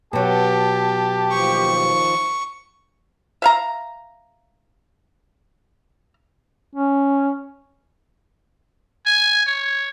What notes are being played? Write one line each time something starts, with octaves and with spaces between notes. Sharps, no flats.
B2 F#3 G4 A5
D#2 F3 C#6
E5 F5 A#5
C#4
G#5
C#5